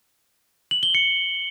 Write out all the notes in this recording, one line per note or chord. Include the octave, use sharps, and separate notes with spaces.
F#7
G7
C#7